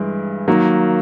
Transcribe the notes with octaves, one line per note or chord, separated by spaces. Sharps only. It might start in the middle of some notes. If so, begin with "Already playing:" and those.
Already playing: G2 E3 G#3
D#3 F#3 A#3